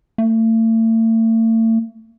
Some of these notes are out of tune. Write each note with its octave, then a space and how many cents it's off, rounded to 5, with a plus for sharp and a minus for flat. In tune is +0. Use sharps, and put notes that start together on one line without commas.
A3 +40